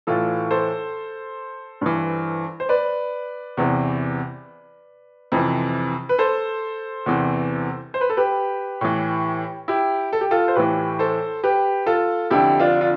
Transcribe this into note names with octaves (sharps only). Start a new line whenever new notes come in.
A2 E3 F4 A4
A4 C5
G2 E3
C5
B4 D5
E2 C3 E3
F2 C3 E3
B4
A4 C5
E2 C3 E3
C5
B4
A4
G4 B4
A2 E3
E4 G4
A4
G4
F4 A4
C5
A2 E3 G4 B4
A4 C5
G4 B4
F4 A4
F2 D3 E4 G4
D4 F4
F4